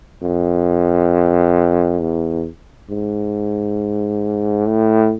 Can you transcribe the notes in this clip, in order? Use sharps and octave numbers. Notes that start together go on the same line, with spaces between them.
F2
E2
G#2
A2